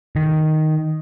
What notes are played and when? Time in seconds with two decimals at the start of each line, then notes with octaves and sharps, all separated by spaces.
0.16 D#3